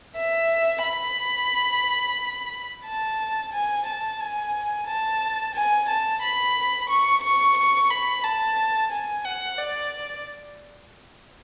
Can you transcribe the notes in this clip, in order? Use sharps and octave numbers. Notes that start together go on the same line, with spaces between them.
E5
B5
A5
G#5
A5
G#5
A5
G#5
A5
B5
C#6
C#6
C#6
B5
A5
G#5
F#5
D5